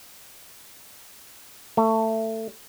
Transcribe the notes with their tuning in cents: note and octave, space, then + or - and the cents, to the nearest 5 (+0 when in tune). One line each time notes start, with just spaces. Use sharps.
A3 +20